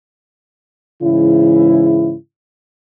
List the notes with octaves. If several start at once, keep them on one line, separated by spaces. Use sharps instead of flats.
G#2 C#3 E3 E4